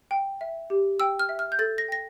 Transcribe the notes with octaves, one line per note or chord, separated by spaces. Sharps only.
G5
E5
G4
G5 E6
F6
E5
F6
G6
A4 A6
A#6
G5 A#6